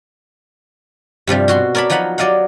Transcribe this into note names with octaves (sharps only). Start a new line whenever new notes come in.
G2 C3 F3 G3
B2 F#4 C6
A#4 C#5 D5 A5 B5
F3 F#3 D#4 F#5 B5
F#3 D5 D#5 F5 F#5